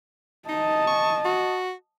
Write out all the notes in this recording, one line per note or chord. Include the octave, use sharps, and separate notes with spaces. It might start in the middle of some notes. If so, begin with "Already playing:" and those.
D#4 D#5 A5
C#6
F#4